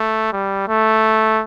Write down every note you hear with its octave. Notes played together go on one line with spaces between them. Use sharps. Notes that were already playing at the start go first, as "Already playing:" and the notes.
Already playing: A3
G3
A3